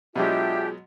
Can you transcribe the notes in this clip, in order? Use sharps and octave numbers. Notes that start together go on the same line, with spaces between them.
B2 F#3 G#3 D4 F4 G4 G#4 E5